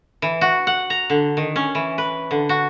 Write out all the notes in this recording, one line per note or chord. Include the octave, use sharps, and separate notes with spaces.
E3
F#4
F#5
A#5
D3
D#3
C#4
E3
B4
D3
F#4